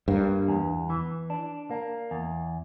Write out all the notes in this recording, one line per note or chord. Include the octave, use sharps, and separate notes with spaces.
G2 A#3
E2
E3
D4
A#3
E2